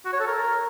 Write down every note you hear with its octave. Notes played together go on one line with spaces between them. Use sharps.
F#4
C#5
A4
A#4